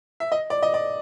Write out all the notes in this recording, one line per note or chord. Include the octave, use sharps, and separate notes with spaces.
E5
D#5
D5
D#5
D5